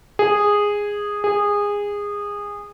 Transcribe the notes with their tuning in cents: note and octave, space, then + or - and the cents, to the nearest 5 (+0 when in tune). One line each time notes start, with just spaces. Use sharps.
G#4 -10
G#4 -20